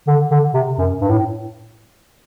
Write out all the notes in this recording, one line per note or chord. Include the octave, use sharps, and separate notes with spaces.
D3
D3
C3
F#2
G2
A2